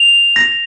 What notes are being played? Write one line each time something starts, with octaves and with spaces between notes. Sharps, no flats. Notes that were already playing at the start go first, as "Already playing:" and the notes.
Already playing: F7
A#6